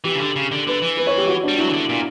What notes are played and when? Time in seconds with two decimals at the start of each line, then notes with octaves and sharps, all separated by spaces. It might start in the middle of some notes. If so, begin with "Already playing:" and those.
0.04 E3 G4
0.15 C#3
0.20 D3
0.36 C#3
0.52 D3
0.66 D3 B4
0.82 E3
0.97 B4
1.07 C#5
1.18 G4
1.28 F#4
1.43 G3 D4
1.58 F#3 E4
1.69 E3
1.73 D3
1.89 A#2